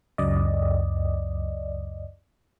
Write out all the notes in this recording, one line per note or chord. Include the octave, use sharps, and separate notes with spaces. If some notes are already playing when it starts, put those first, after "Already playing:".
C#2 F#2 D5 D#5